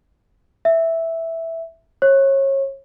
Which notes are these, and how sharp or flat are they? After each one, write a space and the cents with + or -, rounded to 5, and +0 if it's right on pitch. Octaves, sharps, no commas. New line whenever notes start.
E5 -5
C#5 -30